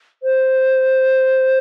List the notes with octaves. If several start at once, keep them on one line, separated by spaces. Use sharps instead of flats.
C5